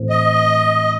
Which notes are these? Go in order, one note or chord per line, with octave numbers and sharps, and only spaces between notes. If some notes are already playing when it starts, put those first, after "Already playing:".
Already playing: A2 E3 A3 C4
D#5